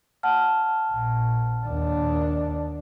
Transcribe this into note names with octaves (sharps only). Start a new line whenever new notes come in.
F#5 A5 F6
A#1
D#2 D4